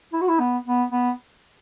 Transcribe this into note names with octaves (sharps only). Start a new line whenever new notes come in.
E4
F#4
E4
B3
B3
B3